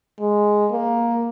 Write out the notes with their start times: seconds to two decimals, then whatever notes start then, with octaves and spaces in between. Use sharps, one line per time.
0.19 G#3
0.71 A#3